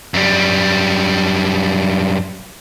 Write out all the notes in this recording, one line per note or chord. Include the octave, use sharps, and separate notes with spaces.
F#2 G3